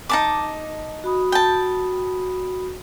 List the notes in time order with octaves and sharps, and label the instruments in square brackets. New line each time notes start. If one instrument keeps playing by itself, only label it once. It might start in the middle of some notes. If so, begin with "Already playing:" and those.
[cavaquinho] D#4 A5 D6
[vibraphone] F#4 B5 D#6
[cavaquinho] G5 A5